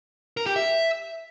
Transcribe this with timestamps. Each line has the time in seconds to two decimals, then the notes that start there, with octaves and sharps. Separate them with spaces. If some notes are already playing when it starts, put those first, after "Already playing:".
0.37 A#4
0.46 G4
0.56 E5